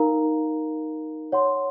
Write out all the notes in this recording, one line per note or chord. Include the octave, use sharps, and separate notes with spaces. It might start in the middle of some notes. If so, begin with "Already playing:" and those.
Already playing: D#4 A#4 F5 A#5
C#5 F#5 C6